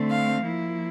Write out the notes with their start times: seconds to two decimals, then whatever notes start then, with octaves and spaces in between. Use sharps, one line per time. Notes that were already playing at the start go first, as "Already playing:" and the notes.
Already playing: D3 A3 C4
0.10 F5
0.44 F3 A#3 E4